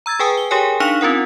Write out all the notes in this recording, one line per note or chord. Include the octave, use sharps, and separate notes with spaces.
A#5 E6 G#6 A6
G#4 B4 G5 G#5 D#6
G7
G4 G#4 A#4 C#5 G5 G#5
D4 D#4 F5 C#6 C#7 F7
C4 C#4 F4 A#4 F#5